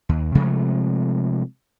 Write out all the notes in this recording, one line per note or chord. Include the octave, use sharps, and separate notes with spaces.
D#2
C3 F3 G#3 A3